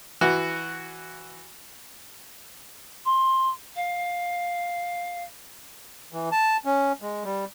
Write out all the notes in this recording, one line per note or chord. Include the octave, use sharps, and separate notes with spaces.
E3 F#4
C6
F5
E3
A5
C#4
G#3
G3